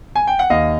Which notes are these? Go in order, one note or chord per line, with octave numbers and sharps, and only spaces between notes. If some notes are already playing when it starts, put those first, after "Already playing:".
G#5
G5
F#5
D#2 D#5 F5